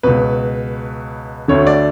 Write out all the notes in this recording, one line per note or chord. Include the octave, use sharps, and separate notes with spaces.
C#2 B2 B4
D2 D3 C#5
D5